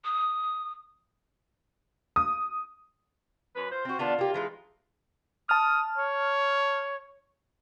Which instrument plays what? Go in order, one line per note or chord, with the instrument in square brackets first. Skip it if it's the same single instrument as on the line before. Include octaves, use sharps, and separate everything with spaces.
[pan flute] D#6
[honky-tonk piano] D#6
[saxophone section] F#2 B4
F4 C5
[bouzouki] C4 F#4
[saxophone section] D3 F4 [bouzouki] D#3 B3 D4
[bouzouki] A#3 G4
E3 G#3 D#4
[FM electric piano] A5 F6 [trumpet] D#6
[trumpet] C#5